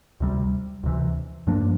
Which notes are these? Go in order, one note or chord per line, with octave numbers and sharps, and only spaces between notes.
D2 C3 G3
D2 C3 E3
G2 F3 A#3 D4